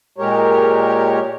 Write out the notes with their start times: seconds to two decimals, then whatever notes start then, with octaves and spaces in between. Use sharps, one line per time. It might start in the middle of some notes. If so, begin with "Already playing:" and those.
0.18 A#2 G#3 G4 A#4 C#5